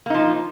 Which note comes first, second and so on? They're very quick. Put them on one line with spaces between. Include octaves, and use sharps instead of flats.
A#3 D#4 F3